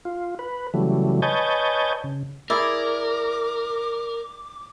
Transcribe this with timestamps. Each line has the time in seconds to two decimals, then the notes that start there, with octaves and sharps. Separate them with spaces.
0.05 F4
0.39 B4
0.74 C#3 E3 F#3 G3 A3
1.22 B4 C#5 D#5 G#5 A5 G6
2.04 C#3
2.50 E4 G#4 A#4 D5 D6